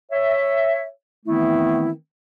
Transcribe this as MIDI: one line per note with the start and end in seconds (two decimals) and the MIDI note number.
0.12 0.83 73
0.12 0.83 76
1.26 1.90 51
1.26 1.90 52
1.26 1.90 57
1.26 1.90 59
1.26 1.90 60
1.26 1.90 64